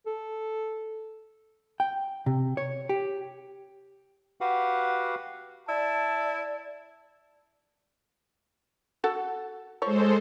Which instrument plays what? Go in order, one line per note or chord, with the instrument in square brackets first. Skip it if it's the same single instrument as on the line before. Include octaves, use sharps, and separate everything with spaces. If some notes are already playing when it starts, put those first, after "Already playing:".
[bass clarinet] A4
[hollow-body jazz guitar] G5
C3
C#5
G4
[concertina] F#4 G4 B4 F5 F#5
[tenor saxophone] E4 [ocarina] D5 [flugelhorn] A5
[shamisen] F#4 A4 F#5
[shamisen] F3 C#5 [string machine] G#3 A4 C5